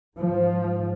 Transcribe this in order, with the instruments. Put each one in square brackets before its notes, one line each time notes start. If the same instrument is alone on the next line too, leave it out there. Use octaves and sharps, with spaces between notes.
[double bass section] G#2 F3